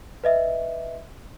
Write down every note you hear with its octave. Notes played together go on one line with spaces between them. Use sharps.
B4 D#5 E5